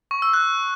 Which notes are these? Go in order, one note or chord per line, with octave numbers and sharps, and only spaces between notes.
C#6
E6
F#6